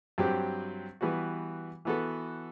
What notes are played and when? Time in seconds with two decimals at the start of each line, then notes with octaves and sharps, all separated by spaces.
0.18 G2 F#3 C4 G4
1.01 E3 G3 B3 F#4
1.85 E3 B3 F#4 A4